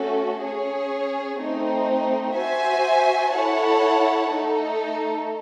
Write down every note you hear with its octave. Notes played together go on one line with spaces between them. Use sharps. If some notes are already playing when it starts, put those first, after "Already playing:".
Already playing: A3 C#4 F#4 A4
C#4 G#4 C#5
A3 C4 D#4
F#4 C5 E5 G#5
E4 A4 C#5 F#5 A5
A3 D#4 A4